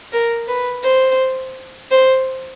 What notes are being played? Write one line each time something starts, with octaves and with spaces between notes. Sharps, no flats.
A#4
B4
C5
C5